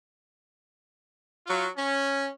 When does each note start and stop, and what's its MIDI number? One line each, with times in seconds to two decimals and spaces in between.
1.47 1.66 54
1.47 1.66 65
1.76 2.27 61